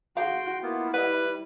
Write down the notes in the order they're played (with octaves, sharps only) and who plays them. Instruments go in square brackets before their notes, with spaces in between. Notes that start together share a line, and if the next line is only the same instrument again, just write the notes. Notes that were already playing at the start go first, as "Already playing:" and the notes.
[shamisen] D3 G#4 F5 [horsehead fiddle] F#4 [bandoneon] G5 C6
[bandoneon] A#3 B3 F4 [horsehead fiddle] E4
[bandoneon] G3 [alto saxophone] B4 [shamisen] D#5 F#5